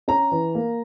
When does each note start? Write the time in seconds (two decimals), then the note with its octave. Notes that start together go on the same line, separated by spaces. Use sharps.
0.08 C#4 A#5
0.32 E3
0.55 A#3